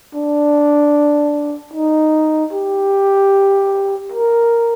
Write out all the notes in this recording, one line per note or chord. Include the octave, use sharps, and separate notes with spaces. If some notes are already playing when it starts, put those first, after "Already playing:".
D4
D#4
G4
A#4